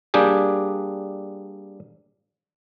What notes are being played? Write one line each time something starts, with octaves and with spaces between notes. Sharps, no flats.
G3 A#3 D4 G4 G#4